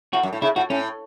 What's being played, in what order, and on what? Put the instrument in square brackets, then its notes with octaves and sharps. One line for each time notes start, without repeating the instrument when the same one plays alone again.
[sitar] A2 [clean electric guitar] F#4
[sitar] F#2
A2
[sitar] C#3 [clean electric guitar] E4
[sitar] A2 [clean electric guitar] F#4
[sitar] A2 [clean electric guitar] C#4